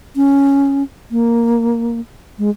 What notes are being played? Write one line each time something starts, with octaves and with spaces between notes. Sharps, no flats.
C#4
A#3
G#3